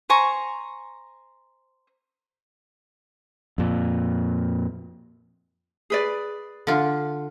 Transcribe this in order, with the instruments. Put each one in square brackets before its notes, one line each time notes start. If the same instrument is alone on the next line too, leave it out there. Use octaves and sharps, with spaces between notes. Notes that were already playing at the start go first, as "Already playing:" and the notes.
[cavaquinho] C5 G#5 A#5 C#6
[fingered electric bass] F2 A#2
[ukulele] G#4 B4 D5
[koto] D3 F4